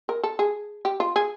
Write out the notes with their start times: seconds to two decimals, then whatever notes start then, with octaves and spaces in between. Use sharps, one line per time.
0.09 A#4
0.24 A4
0.39 G#4
0.85 G4
1.00 F4
1.16 G#4